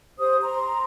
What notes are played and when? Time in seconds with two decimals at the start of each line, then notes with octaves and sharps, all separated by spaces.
0.19 G4 C5 D#6
0.42 A#5 C6